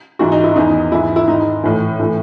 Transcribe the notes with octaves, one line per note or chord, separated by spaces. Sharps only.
G#2 E3 F#4
D#4
E4
E2 D#3 D#4
G#2 E3 E4
E4
G#2 D#3 D#4
A2 E3
A2 E3